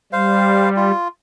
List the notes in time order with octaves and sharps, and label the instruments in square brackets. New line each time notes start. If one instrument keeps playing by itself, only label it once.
[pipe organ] G3 [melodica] C5 F5
[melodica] F4